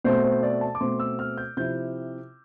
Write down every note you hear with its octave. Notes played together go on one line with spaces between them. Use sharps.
B2 A3 C4 C5
C5
D5
A5
D6
B2 A3 C4 C6
E6
F6
G6
C3 F3 C4 E4 G6